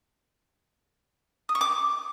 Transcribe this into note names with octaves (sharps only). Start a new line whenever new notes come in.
D#6
C#6
D6